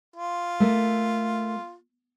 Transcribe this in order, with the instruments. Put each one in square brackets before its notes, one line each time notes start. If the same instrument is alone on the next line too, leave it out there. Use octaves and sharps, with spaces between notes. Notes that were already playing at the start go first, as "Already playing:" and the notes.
[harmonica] F4
[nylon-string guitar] A3 A#3